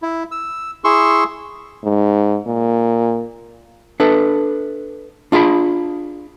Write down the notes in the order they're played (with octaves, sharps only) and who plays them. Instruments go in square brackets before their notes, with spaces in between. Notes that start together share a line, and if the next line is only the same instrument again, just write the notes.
[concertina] E4
E6
E4 G#4 C6 C#6 E6
[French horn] G#2
A#2
[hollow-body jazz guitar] D4 A4 B4
D4 F4 G#4 A#5 B5